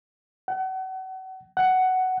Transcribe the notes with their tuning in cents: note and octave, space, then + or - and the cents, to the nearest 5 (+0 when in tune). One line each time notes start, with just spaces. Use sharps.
F#5 +35
F#5 +10